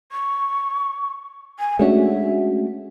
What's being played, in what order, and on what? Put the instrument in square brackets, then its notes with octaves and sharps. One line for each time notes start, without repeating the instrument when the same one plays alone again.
[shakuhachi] C#6
G#5
[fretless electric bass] G#3 D4 [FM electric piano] A3 C#4 F#4 [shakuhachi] E5